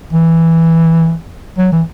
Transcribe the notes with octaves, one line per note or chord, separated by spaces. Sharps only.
E3
F#3
E3